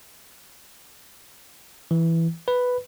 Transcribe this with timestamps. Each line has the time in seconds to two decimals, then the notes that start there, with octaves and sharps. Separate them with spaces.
1.91 E3
2.48 B4